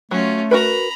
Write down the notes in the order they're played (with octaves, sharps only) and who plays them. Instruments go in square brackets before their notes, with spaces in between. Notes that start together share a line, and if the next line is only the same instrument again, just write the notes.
[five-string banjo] F#3 [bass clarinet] A3 [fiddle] C#4 F4
[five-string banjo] F#4 A#4 B4 [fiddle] A#5 B5